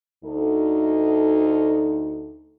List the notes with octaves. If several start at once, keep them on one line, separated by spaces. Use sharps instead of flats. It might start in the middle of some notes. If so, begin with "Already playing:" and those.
D2 D#4 A4